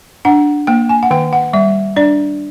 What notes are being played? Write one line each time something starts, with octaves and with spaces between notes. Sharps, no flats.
D4 F#5
A#3 G5
G#5
F#5
D#3 G5
F#5
G3 E5
D4 D5